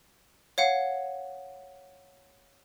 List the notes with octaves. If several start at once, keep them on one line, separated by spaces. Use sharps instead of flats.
C#5 F5 F#5